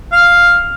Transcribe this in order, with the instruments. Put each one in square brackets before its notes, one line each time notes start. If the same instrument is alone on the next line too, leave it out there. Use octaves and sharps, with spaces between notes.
[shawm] F5